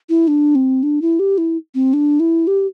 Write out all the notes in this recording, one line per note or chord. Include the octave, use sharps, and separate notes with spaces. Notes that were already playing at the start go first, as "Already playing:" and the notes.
E4
D4
C4
D4
E4
G4
E4
C4
D4
E4
G4